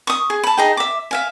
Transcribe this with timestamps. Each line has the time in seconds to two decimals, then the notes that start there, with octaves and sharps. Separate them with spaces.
0.07 C#6 D#6
0.30 G#4
0.43 A5 B5
0.57 D#4 G#4 G5
0.77 E5 D6
1.11 E5 F5 G#5